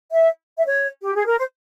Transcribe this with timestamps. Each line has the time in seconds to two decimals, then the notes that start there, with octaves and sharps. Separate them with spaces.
0.11 E5
0.57 E5
0.65 C#5
1.03 G4
1.14 G#4
1.26 A#4
1.38 C5